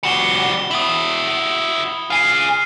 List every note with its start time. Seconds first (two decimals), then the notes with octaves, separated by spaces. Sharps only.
0.03 G3 F#4 C#7 E7 G7
0.71 E4 F#4 D#6 F#7
2.10 F4 G#4 F6 C7 D#7